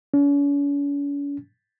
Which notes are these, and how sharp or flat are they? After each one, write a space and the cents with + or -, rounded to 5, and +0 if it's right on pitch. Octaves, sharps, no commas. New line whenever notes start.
C#4 +45